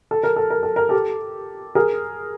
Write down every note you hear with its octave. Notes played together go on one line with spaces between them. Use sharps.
A4
A#4
A4
A#4
A4
A#4
G4 A4
G#4 A#4